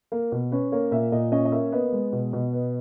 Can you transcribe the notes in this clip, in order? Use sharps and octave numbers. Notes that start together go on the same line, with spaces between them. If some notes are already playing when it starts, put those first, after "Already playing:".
A#3
B2
C#4 B4
A#3 C#5
A#2 E5
A#2 D#5
C#4 D#5
D#5
A#3 E5
B3 D#5
G#3
B2
B2
B3